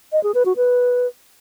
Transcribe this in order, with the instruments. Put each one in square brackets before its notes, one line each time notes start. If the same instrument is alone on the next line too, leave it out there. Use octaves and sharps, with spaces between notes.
[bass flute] D#5
G#4
B4
F#4
B4